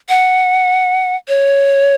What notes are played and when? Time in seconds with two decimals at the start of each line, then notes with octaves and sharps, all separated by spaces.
0.09 F#5
1.28 C#5